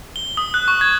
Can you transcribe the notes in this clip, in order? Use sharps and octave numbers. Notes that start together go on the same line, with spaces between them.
G7
D#6
F#6
C#6
G#6